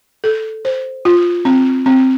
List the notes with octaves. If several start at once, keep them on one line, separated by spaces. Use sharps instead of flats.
A4
C5
F4
C4
C4